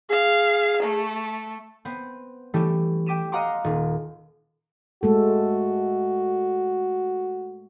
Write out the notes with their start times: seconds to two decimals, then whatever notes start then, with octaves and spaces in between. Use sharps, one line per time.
0.10 G#4 F5
0.82 A3
1.85 B3 C4 B4 C5
2.54 E3 G3 A3 C#4 G4
3.06 G5 D6 B6 D#7 E7
3.32 D#5 F5 F#5 A#5 C6 D6
3.64 D#1
5.03 G#3 A3 F#4 A4